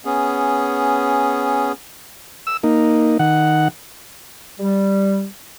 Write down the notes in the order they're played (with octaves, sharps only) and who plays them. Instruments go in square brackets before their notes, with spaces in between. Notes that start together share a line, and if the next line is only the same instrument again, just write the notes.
[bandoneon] B3 C#4 G#4
[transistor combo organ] E6
A#3 D#4
D#3 F#5
[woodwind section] G3